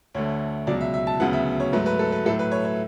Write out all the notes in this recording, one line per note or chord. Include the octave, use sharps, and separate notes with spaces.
D2 D3 A3 C#5
C#2 B2 F#3 D5
E5
E5
A5
D2 C#3 F#3 B3 F#5
E5
C#5
G#2 F#3 A3 B4
B4
A4
B4
A2 F#3 A3 A4
B4
C#5
C#5